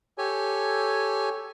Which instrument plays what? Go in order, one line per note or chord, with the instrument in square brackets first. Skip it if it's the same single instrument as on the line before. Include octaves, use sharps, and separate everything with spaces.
[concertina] G4 A4 C#5 G#5